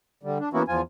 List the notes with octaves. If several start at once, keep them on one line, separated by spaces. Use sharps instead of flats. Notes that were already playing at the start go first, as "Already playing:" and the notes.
D3 G3
D4
E3 A#3 B3 C#4 E4 F#4
E2 F3 F4 G#5